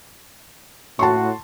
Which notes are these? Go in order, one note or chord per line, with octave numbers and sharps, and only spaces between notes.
A2 F#4 A5 C6 C#6